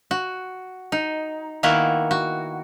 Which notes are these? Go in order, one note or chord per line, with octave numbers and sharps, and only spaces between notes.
F#4
D#4
D#3 A#3 B3 E4 F#4 A#4
F#4